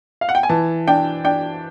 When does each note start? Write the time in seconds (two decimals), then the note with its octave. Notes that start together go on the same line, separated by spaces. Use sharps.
0.21 F5
0.29 F#5
0.35 G5
0.43 G#5
0.49 E3 A5
0.88 D4 G5
1.24 D4 G5